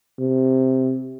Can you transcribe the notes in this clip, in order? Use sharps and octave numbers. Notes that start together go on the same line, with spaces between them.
C3